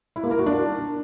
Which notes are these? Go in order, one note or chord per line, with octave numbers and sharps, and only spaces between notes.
E4
A#3
A#4
F#4
D4